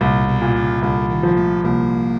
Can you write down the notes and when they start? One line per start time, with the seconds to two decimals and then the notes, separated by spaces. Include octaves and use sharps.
0.01 C2 A#2
0.28 B2
0.42 A#2
0.56 C#3
0.82 C2 D3
1.10 D#3
1.23 F3
1.37 A3
1.64 C2 A#3